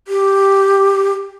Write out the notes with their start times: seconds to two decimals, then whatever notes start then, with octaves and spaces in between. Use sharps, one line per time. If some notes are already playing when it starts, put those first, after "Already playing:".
0.08 G4